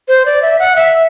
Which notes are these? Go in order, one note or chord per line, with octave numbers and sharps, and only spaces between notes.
C5
D5
E5
F#5
E5